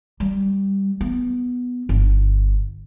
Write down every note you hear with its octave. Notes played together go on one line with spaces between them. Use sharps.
G3
B3
G1